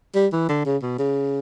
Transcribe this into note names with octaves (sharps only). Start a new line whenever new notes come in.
G3
E3
D3
C#3
B2
C#3